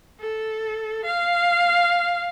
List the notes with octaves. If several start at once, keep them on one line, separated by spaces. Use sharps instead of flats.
A4
F5